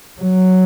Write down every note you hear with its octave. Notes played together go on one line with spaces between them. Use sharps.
F#3